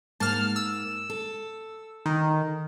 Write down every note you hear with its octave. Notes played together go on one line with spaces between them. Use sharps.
G#2 A#3 A5 F6
E6
A4
D#3